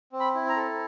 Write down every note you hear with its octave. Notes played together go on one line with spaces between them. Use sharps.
C4
B5
E4
A#5
A4